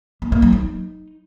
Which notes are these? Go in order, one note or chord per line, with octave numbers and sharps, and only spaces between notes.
A#3
A#3
F#3
D#4